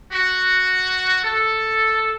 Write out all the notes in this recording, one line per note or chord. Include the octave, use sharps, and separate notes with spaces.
F#4
A4